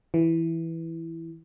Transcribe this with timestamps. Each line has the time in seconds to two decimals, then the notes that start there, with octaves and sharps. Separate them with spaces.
0.14 E3